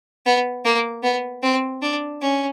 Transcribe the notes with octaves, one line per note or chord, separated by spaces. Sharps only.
B3
A#3
B3
C4
D4
C#4